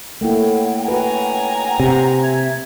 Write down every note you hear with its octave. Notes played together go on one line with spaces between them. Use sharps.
A3 A#3 E4 C#5 F#5 G5
F#4 B4 G#5 A#5
C3
E5 G#6